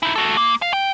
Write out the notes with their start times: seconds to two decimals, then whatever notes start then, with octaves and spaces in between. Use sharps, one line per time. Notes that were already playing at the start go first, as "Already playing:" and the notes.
0.03 D#4 E4
0.16 F#4 A4
0.37 A#3
0.62 F5
0.73 G5